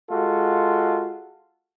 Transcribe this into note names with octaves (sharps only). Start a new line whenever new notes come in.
G#3 F4 F#4 A4